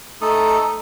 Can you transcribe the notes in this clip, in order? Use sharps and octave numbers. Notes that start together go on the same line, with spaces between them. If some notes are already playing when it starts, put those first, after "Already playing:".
A3 D#4 A4 D#6